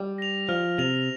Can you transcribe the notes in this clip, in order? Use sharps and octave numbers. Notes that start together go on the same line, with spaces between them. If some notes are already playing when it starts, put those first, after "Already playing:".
Already playing: G3
A#6 F7
F3 F6
C3 A#6 F7